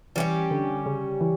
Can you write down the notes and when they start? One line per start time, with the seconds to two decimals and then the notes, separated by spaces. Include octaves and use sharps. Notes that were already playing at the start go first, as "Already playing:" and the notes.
0.16 E3 G3 C#4 G4
0.51 D3
0.86 C#3
1.21 E3